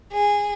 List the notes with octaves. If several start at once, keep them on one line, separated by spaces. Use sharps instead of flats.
G#4